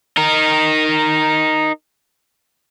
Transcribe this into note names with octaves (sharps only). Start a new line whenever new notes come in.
D#4 A#4